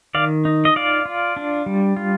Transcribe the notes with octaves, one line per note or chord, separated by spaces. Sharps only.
D#3 D5 F5
D#4
D#5
F4 D5 F5
F4
D4
G3
F4